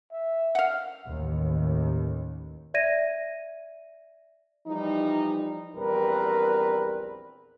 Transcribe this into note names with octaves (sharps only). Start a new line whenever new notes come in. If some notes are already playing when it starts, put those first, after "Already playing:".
E5
F5 F#5
A1 D#2
D5 E5 G#6 A#6 D#7
E3 F3 G3 D#4
A#1 E2 G3 C4 A#4 B4